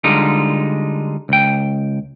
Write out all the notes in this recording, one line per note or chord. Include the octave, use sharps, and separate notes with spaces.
D3 G3 G#3 D#4 F4
C#2 G5